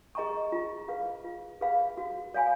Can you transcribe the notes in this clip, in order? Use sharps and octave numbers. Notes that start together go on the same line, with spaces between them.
G#4 D#5 A#5 C#6
F4
G#4 B4 F5 B5
F4
G#4 B4 F5 B5
F#4
C#5 F5 G#5 B5